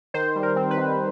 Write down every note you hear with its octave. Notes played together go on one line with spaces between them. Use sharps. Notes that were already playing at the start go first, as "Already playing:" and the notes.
D#3 C5
G3
A#4
C4
B4
D#3